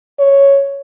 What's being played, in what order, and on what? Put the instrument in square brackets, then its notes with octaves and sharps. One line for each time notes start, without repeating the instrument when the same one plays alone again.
[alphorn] C#5